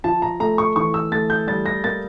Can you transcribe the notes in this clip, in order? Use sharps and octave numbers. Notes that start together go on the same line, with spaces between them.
F3 A5
A#5
A3 A#5
C#6
E3 C#6
E6
A3 A6
G6
G3 A6
A#6
A#3 A6